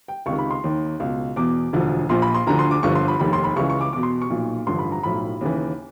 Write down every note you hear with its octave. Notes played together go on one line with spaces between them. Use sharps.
G5
C#2 C3 D#3 C#6
B5
C6
D#2 D#3
C#2 B2
E2 B2 D6
E1 D2 D3 F3
A#1 A#2 F3 C6
B5
C6
D2 D3 F3 A#5
C6
D6
G1 G2 D3 F3 C#6
C6
B5
F1 D#2 D#3 B5
C6
B5
C#2 C#3 E3 C#6
C#6
D6
E2 B2 D6
C6
C#6
B1 A#2 F3
A1 G2 D3 F3 C6
B5
A#5
B1 A2 F3 B5
D#2 C#3 E3